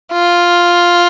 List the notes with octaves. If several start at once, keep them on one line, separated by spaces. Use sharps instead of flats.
F4